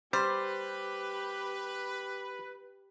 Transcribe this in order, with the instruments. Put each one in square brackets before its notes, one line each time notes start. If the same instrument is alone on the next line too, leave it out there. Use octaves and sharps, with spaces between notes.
[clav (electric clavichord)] G3 [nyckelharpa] G4 [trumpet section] B4 [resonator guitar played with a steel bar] C5